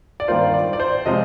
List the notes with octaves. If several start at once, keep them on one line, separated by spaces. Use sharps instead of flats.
D5
G2 D#3 A#3 F4 C5
D5
D5
C5
C3 F3 G#3 C4 D#5